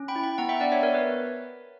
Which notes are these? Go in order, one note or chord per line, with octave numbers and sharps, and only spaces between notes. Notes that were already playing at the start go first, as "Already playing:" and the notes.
Already playing: C#4
G5 B5
E4
G5 B5
B3 F#5 A#5
E5 G5
D4 D5 F#5
C#5 E5
B3 A#4 C#5
B4